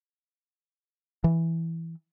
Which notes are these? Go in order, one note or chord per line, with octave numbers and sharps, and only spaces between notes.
E3